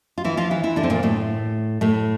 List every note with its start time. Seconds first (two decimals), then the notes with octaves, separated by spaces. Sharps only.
0.18 F4
0.24 E3 E4
0.37 F3 F4
0.51 E3 E4
0.63 E3 E4
0.76 D3 D4
0.83 C4
0.90 A#2 A#3
1.03 A2 A3
1.81 A2 A3